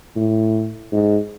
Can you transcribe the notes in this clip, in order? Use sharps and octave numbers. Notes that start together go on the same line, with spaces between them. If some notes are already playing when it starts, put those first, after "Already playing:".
A2
G#2